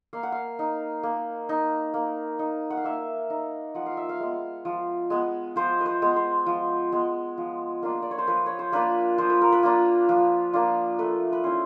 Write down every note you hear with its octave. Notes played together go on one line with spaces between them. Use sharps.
A#3 F5
F#5
F5
D#4
A#3
D#4
A#3
D#4
F#5
F5
A#3 E5
D#4
F3 F#5
F5
E5
F5
G#3 B3
F3
G#3 B3
F3 C5
B4 C5
G#3 B3
C5
F3
G#3 B3
F3
A#3 D4 F4
D5
C#5
C5
F3 B4
C#5
C5
A#3 D4 F4 B4
F3 C5
B4
A#4
B4
A#3 D4 F4
F3
A#3 D4 F4
A3 B4
B4
C#4 E4 C5